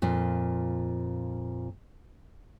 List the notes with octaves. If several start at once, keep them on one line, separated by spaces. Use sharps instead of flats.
F2 A#2